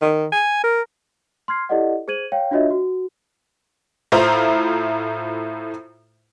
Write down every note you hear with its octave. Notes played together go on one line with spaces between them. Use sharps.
D#3
G#5
A#4
C6 F6 G#6 C7
E4 G4 A4 D5 D#5 F#5
G#4 C5 G#6 D#7 F#7
C#5 F5 G5
D4 F4 F#4 C#5 D#5 E5
F#4
A2 E4 F4 C5 A#5